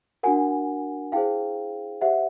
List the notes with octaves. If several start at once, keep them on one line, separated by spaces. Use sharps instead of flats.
D4 F#4 A#4 F#5 G#5
E4 G#4 C5 F5 G5
G4 C5 E5 F#5